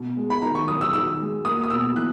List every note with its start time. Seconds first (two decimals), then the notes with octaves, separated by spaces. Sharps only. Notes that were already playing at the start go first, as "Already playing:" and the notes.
Already playing: B2
0.17 G#3
0.30 B5
0.42 D#3 A#5
0.55 C#6
0.68 F#3 D#6
0.81 E6
0.93 D#3 E6
1.20 G#3
1.45 A#3 D#6
1.64 D#6
1.70 B2 E6
1.96 E3 F#6